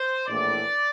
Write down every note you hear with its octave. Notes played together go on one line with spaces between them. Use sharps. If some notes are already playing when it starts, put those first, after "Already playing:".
Already playing: C5
A#1 A2 E3 D5